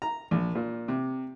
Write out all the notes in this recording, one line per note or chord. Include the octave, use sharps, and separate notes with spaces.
A#5
A#1
A#2
C3